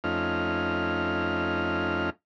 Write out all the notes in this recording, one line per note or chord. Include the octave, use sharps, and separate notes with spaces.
F2 A3 C#4 D#4 F4 F6